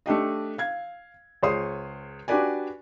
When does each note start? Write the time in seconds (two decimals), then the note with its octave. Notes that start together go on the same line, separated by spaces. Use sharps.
0.06 A3 D4 G4 D#5
0.58 F5 G#6
1.43 C#2 G#4 C5 C#5 C6 D#6
2.28 D4 F#4 G4 B4 D5 G#5